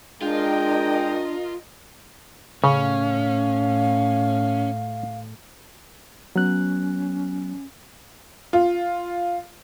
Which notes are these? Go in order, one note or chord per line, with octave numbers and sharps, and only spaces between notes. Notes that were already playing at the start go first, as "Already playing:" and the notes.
G#3 D4 F4 A#4 D#5 G5
A2 C#3 C#4 F5
F#3 B3 C#4 F#6
F4